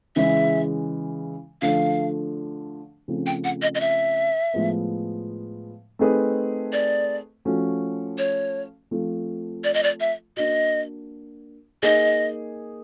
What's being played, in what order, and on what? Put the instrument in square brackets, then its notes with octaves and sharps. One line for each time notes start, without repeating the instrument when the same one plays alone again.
[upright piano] C#3 E3 G#3 [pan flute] E5
[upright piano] D3 F3 A3 D4 [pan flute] F5
[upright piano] C#3 F3 A3 C4
[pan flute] G5
F#5
D#5
D#5
E5
[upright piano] A2 F3 G#3 B3
A3 C4 D#4 G#4 B4
[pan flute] D5
[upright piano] F3 A3 C#4 F#4
[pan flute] C#5
[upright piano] F3 A3 C4 F4
[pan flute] D5
D#5
D5
E5
[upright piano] A#3 D4 F#4 [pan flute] D#5
[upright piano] A#3 D#4 G#4 [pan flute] D#5